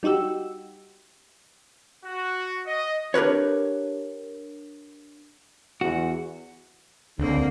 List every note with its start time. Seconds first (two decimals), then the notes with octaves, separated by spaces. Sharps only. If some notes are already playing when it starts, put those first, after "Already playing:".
0.03 G3 D#4 F#4 G4 E6
2.05 F#4
2.66 D#5
3.14 D4 G4 A#4 B4 C#5
5.81 E2 F#4
7.19 C#2 D3 A#3 C4